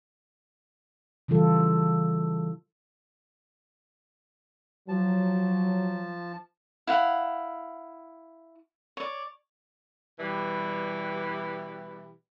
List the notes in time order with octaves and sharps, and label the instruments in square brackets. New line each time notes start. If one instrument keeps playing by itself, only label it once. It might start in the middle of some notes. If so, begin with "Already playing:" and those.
[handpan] C#3 E3 G3 F4 A4
[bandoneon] F3 A5 [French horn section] F#3
[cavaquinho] E4 F5 F#5
C#5 D5
[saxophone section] B2 E3 G3